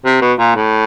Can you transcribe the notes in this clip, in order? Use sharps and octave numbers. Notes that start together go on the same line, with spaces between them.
C3
B2
A#2
A2